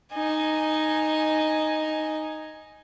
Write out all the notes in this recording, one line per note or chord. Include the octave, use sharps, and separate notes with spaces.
D#4 G#5